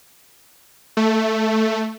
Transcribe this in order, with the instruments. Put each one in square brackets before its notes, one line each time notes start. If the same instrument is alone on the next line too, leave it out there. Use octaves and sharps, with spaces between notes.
[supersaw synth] A3